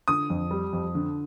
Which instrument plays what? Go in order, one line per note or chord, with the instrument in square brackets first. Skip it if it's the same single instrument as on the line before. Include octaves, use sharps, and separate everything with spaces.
[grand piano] D3 [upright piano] D#6
[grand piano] F2
G3
F2
D3